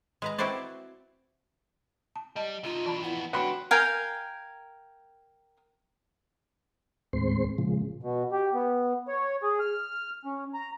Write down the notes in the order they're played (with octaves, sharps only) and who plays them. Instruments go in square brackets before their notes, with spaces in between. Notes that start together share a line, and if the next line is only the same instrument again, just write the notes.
[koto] G#3 B4 A#5
C4 E4 F#4 B4 C5 D5
[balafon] A5
[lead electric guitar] G3 [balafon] D#5 A5
[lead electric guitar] D3 D#4 [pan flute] F4
[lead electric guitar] B2 D4 [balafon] E3 A5 B5
[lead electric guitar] F2 B3 [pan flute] E4
[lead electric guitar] D3 D4 [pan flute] F#4 [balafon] B4 G5 [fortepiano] F#5 B5 C6
[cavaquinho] A#4 F5 G5 G#5
[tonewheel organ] D#2 A2 G#3 C4 C5 C6
A#2 C#3 F3 G#3
[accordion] B2
G4
B3
C#5
G#4
F6
C#4
A#5